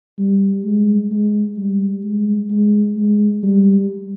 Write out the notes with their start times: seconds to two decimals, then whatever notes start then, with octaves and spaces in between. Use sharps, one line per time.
0.19 G3
0.65 G#3
1.12 G#3
1.57 G3
2.04 G#3
2.51 G#3
2.97 G#3
3.43 G3